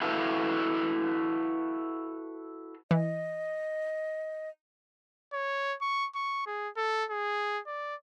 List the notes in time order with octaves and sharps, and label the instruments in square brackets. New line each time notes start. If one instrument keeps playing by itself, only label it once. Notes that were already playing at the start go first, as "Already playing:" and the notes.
[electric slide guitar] E4 F#4 A4 B4 F5
[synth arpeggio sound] E3 [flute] D#5
[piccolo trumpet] C#5
C#6
C#6
G#4
A4
G#4
D5